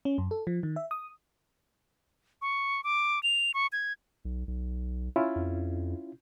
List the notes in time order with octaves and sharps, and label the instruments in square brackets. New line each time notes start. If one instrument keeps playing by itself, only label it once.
[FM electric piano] C#4
F#2
A4
F3
D#3
E5
D#6
[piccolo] C#6
D6
F7
C#6
G#6
[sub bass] B1
B1
[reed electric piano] C#4 E4 F4
[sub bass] F2